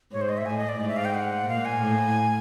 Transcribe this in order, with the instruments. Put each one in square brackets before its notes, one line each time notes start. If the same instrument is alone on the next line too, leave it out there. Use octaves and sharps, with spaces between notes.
[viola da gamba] G#2 [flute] C#5
[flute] C5
D#5
E5
[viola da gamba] A2 [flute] G#5
[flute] D#5
D5
[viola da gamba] G#2 [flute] D#5
[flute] E5
F5
G5
F#5
[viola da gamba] A#2 [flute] F5
[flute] G#5
[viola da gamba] A2